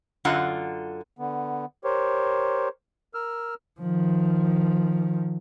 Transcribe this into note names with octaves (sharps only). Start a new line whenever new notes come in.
F#2 D3 F4 F#5 A#5
D3 B3
G4 A#4 C5 C#5
A#4 E6 F6
D#3 F3